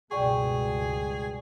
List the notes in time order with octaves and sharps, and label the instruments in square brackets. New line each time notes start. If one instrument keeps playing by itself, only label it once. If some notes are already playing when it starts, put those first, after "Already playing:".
[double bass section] C#2 G2 B2 [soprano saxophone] G#4 [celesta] D5 G5 C#6